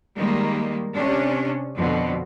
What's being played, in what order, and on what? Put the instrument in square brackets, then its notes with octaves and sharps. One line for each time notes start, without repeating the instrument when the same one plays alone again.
[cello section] D#3 G3 G#3 A#3
C3 C#4 D4
F2 B2 D3